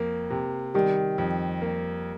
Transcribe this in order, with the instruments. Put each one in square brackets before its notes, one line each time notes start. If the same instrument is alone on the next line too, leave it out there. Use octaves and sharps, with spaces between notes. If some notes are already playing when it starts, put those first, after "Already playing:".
Already playing: [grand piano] F2 A#3
C3
[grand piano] D#3 [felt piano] G3
[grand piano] F2
A#3